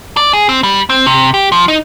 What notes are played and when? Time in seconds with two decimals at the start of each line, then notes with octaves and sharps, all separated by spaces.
0.17 D5
0.33 G#4
0.49 C4
0.63 G3
0.90 C4
1.07 C3
1.34 G4
1.52 F3
1.68 D#4